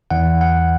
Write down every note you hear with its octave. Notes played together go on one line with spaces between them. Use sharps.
E2 E3 F#5
F#5